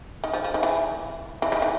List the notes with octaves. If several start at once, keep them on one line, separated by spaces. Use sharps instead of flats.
D#3
F3
F3
D#3
E3
E3
D#3
E3